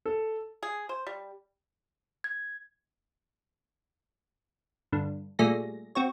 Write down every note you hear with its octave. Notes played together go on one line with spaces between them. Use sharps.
A4
G#4
C5
G3
G#6
G2 D3
A#2 G3 A3 G#4 A#6
C4 F#4 C#5